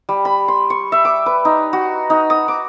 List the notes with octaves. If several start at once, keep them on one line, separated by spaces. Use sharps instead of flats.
G3
B5
C6
C#6
E5
D6
B4
D#4
F#4
D#4
D#6
D6